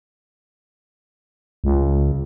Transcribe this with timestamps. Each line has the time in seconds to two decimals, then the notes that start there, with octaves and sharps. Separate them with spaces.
1.64 C#2